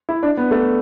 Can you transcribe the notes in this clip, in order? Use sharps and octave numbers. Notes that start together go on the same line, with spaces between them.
E4
D4
B3
A3